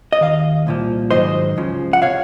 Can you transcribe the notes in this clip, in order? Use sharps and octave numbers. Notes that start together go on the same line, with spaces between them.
D#5
D#2 D#3 F5
C2 A#2 F3
G#2 D#3 F#3 C5 D#5
C#2 C#3 F3
F#5
C3 C#5 F5